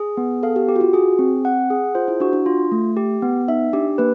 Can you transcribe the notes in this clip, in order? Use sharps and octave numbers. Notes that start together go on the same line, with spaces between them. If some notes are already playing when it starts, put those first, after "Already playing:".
Already playing: G#4
B3
A4 F5
G4
G4
F#4
F4
F#4 G#4
C4
F#5
G#4
F4 C5
E4
D4 F#4
D4
F4
A3
G4
B3
D#4 E5
D4 G4
A#3 B4